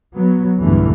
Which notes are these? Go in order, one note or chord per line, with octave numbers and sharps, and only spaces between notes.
F#3 B3
B1 E2 G2 D3 E3 A3